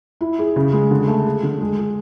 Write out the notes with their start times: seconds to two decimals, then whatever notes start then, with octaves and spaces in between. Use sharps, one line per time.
0.21 E4
0.39 G#4
0.56 C#3
0.73 G#3
0.91 D3
1.08 A3
1.26 G#4
1.43 D3
1.61 G#3
1.79 G#4